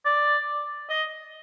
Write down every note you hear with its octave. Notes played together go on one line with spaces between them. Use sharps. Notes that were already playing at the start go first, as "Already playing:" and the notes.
D5
D#5